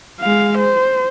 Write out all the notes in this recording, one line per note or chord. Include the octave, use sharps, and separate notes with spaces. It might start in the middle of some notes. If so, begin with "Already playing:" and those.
G#3 F5
C5